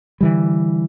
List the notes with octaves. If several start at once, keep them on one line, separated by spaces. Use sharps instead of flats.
D3 E3 G3